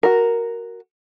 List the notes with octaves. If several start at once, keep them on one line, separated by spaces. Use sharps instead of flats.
F#4 A#4